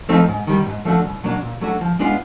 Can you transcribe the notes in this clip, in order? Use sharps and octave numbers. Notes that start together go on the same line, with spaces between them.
F3 A3 C4 D#4
G#2
D#3 G3
G#2
F3 A3 D4 F#4
C2
B2 F#3 A#3 D4
A#2
F#3 A3 D4 F#4
F3
G#3 B3 D4 F4